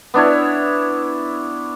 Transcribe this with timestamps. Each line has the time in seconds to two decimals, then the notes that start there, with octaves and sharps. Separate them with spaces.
0.14 B3 D4 E4 C#5